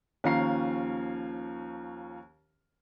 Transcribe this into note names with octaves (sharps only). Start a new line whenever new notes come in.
D#2 F3 C#4 F5 A#5 C7